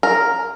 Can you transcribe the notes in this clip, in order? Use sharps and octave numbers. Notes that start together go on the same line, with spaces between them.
A#4